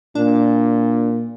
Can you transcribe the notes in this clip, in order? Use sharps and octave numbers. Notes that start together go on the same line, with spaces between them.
A#2 D4